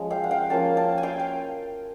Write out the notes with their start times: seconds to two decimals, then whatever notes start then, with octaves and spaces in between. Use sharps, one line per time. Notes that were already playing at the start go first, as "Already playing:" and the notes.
Already playing: F3 G#3 C#4
0.10 F5 G5
0.24 F#5
0.31 F5 G5
0.50 F3 A#3 C#4 G5 A5
0.77 G5 A5
0.98 G#5
1.03 F5 G5
1.20 G5